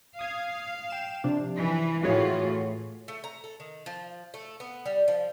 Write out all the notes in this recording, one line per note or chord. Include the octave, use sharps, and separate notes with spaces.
F5 D#6 G#6
G5 E7
C3 F3 D4
E3
A2 E3 F4 F#4 G#4 C#5
A3
A#5
A4
D#3
F3
A3
B3
G3
F3